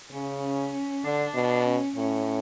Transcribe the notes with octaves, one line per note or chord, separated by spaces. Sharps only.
C#3 C#4
C#4
D3 D4
B2
C#4
A2 C#4